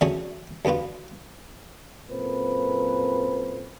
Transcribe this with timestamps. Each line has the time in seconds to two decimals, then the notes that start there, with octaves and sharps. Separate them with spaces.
0.01 D3 F#3 A3 C#4 G#4 C#5
0.65 D2 G2 B3 F4 F#4
2.10 F#2 A#2 C4 A4 B4 C5